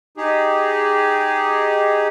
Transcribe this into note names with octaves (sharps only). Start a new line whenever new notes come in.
D#4 G4 G#4